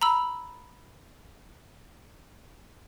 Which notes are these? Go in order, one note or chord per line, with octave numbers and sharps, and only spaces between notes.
A#5 B5 E6